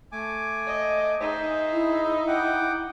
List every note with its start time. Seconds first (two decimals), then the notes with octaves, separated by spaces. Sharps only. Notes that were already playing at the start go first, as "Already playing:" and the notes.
0.12 A3 G#5 D6
0.67 D#5
1.21 D#4 G#4 C5 E5
1.73 E4
2.27 F#5 G5 D6